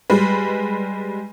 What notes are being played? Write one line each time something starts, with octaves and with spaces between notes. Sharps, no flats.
G3 G#3 B4